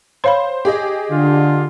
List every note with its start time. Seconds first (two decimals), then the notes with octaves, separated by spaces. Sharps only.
0.24 C5 C#5 F5 B5
0.65 G4 G#4 D#5
1.11 D3 F4